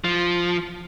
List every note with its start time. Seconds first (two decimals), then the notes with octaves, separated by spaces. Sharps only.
0.04 F3